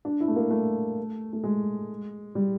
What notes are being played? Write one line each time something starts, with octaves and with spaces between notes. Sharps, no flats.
D4
E4
A3
A#3
A3
A3
G#3
G3